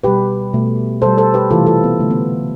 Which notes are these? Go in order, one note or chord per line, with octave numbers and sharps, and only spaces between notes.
B2 G3 G4 B4
B2 A3
B2 G3 A4 C5
A4 C5
G4 B4
C3 E3 A3 F4 A4
F4 A4
B3
D3 A3
B3